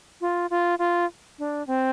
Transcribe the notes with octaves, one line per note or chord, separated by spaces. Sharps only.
F4
F4
F4
D4
C4